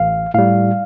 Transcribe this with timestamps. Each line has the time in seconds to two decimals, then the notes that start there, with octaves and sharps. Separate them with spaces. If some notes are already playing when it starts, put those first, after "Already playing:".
Already playing: A1 F5
0.34 A2 G3 F5